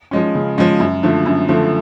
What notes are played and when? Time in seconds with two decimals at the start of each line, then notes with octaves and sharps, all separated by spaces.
0.11 F3 G#3 C#4
0.35 C#3
0.58 F3 G#3 C#4
0.80 F#2
1.03 D3 F3 A3
1.26 F#2
1.48 D3 F3 A3